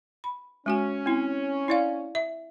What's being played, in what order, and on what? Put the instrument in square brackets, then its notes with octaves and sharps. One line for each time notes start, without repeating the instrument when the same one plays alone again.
[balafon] B5
[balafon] G#3 F#4 G#5 [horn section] C#4
[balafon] C4 E4
E4 D5 F5
E5